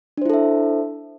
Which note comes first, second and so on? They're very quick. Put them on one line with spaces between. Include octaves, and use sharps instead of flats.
D4 C5 E4 A4 E5